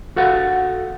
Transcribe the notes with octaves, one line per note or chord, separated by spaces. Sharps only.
F#4 A4 F5 F#5